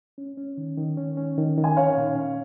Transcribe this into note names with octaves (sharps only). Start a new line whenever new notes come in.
C#4
C#4
D#3
D#3
C#4
C#4
D#3
D#3
G#5
C#4 C#5 F5
A#2
C#4